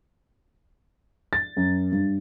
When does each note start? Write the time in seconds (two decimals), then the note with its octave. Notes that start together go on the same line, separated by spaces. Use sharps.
1.33 A6
1.57 F#2
1.92 G2